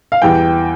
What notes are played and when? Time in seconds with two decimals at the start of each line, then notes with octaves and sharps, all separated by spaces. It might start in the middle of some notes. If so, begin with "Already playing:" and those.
0.12 F5
0.22 E2 E3 G3 G5